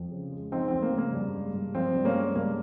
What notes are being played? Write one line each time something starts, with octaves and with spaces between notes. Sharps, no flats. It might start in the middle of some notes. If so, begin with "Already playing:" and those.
Already playing: F2
C#3
G#3
F3 C4 D#4
F2 C4
A#3
C#3
A#3
G2
G#3
G2
F3 C4
G2
A#3 C#4
G#3
G2 A#3